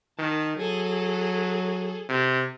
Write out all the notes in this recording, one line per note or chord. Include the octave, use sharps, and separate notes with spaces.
D#3 A5
F#3 G#4 A4
C3